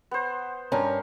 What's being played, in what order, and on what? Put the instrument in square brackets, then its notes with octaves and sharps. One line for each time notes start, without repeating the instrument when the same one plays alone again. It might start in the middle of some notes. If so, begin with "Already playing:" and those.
[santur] B3 C5
[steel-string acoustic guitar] G2 C#4 [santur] A#4